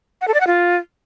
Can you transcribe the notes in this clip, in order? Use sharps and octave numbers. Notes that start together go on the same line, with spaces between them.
F#5
A4
D5
F#5
F4